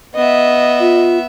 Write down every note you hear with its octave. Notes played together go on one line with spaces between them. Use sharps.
B3 D#5 E5
F4